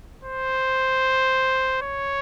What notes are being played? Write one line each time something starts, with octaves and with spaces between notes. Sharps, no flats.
C5
C#5